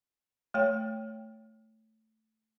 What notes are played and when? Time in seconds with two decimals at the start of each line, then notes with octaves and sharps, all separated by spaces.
0.54 A3 C#5 G5